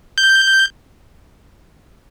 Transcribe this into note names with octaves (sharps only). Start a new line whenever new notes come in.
G6